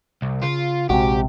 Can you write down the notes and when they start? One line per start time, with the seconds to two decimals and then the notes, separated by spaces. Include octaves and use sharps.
0.22 C2
0.42 C#3 F4
0.90 A#1 C3 G#3 F#4 G4